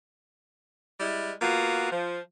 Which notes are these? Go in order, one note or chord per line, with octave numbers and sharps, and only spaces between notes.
G3 G#3 E4
A#3 B3 F4 F#4
F3